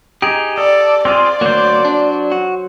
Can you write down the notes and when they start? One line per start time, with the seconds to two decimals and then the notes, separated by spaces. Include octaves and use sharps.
0.22 D#4 G4 G#4
0.58 A4 D5
1.05 C4 F4 G#4 D5
1.41 D2 F#3 A#3 C5
1.85 D4
2.32 F#4